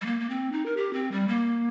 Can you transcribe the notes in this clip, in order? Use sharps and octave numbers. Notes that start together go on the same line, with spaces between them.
G3
A#3
A#3
C4
D#4
A#4
G4
C4
G3
A#3